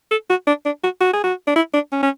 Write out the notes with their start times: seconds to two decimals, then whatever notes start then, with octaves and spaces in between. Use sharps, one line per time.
0.11 A4
0.30 F#4
0.47 D4
0.65 D4
0.83 F#4
1.01 F#4
1.13 G#4
1.24 F#4
1.47 D4
1.56 E4
1.74 D4
1.92 C#4
2.03 C#4